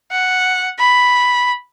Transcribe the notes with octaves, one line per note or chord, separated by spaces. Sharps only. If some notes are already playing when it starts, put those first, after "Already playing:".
F#5
B5